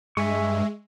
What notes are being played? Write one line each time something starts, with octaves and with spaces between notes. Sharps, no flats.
G2 G#3 E5 G#5 C#6